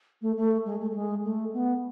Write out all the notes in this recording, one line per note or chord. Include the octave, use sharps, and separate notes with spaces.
A3
A3
G#3
A3
A3
G#3
A3
B3